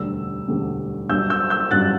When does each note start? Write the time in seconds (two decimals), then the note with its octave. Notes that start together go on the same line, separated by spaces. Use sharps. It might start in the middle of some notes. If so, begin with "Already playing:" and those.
Already playing: E1 D2 D3 G3 E6
0.48 E1 D2 D3 G3
1.09 G1 G2 F#3 E6 G6
1.30 E6 G6
1.50 E6 G6
1.71 G1 G2 F#3 F#6 A6